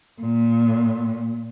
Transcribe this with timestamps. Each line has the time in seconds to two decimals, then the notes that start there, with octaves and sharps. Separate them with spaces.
0.20 A#2